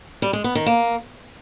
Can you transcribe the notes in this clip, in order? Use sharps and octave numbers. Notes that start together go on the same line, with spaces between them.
G3
G#3
B3
D#3
A#3